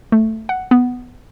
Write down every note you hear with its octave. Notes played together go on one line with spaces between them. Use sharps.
A3
F#5
B3